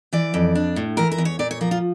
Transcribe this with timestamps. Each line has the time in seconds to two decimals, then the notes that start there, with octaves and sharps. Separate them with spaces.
0.13 E3 D5
0.34 F2
0.55 D4
0.76 A2
0.97 E3 A#4
1.12 A#4
1.18 E2
1.25 C#5
1.39 A#2 D5
1.51 C#5
1.61 F3 A#4
1.71 F4